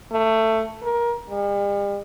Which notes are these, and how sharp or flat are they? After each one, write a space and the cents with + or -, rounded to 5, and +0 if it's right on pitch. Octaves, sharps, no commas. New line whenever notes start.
A3 +15
A#4 +20
G3 +45